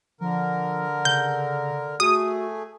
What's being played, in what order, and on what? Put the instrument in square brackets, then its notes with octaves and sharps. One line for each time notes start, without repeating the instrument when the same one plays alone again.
[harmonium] D3 A#4 [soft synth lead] F3
[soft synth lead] C#3 [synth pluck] G6
[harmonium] A3 G#4 [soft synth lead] F#4 [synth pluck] D#6